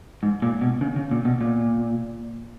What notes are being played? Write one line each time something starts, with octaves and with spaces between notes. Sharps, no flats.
G#2
A#2
B2
C#3
C#3
A#2
B2
A#2